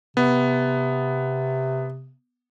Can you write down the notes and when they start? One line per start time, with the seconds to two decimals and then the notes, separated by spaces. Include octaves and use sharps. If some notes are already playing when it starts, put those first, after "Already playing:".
0.17 C3 B3